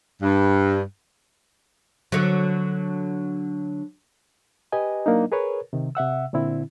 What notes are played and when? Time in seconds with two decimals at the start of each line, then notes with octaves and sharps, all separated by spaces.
0.22 G2
2.12 D3 F#3
4.72 G4 B4 D#5 G#5
5.06 F#3 A#3 D4 D#4
5.32 G#4 A#4 B4 C#5
5.73 C3 D#3
5.95 C3 E5 F#5 E6
6.33 A#2 D3 C4 E4